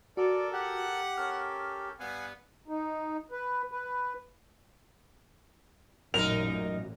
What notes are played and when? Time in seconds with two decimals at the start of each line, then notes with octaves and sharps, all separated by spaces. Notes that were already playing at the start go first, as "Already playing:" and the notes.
0.17 F#4 A4 A#4 D5
0.52 G4 F#5
1.17 C#4 A4 A#4 F6
1.99 G2 B3 F5 F#5 G#5
2.68 D#4
3.31 B4
3.71 B4
6.14 A1 F#2 A#2 D#4 A#4 F7